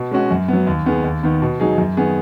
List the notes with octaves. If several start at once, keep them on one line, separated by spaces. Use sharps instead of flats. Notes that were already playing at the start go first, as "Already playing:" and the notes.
Already playing: B2
G#3 C#4 F#4
F#2
F#3 B3
D#2
D#3 B3 G#4
D#2
D#3 B3
B2
F#3 D#4 G#4
F#2
D#3 B3 G#4